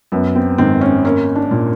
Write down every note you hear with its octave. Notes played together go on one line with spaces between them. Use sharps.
F#2 B3
C4
G#1 C4
C#4
A#3 C#4
D4
A#2